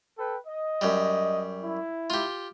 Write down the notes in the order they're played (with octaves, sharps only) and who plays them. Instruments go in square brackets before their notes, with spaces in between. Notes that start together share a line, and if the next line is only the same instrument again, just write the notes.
[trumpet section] A4 B4 G5
D#5
[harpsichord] F#2 G3
[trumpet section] E4
[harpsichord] F4 G4